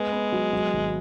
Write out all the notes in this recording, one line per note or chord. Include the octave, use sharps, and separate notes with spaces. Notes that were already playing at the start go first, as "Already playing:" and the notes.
Already playing: G#3 B3
B3
F#3
F#3
G#1